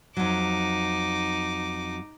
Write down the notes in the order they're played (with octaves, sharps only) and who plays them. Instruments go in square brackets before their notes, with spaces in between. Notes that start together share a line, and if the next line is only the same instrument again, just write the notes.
[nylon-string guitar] F2 F#3 [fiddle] D#4 D6